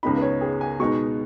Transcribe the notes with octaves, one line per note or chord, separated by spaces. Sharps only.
C#2 C#3 B3 D#4 B5
B4
C#5
G#4
G#5
B2 G#3 B3 D#4 C#6